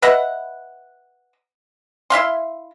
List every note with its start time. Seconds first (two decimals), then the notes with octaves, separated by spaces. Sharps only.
0.02 B4 D#5 E5 F#5
2.10 E4 E5 F5 C6